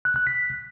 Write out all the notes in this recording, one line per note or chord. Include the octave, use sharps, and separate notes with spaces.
F#6
F#6
B6